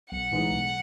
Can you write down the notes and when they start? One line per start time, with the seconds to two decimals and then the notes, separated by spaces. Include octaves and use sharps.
0.12 B1 F#5
0.31 A2 E3 G#3 D#4
0.52 B1